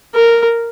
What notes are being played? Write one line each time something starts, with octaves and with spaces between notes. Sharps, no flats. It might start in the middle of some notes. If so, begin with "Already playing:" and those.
A#4